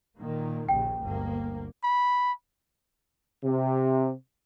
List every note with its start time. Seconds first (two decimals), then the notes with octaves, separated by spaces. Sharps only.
0.17 A#2 D#3 A#3
0.69 A#1 D#2 C#3 G5
1.01 G1 D2 A#3
1.83 B5
3.43 C3